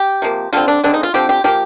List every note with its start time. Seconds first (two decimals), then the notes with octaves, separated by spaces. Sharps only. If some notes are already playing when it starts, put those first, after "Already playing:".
Already playing: G4
0.22 C3 F3 A#3
0.53 D3 G3 C4 F4
0.68 D4
0.84 D3 G#3 C4 D4
0.94 D#4
1.03 F4
1.14 D3 F3 C4 G4
1.29 G4
1.44 F3 A#3 G4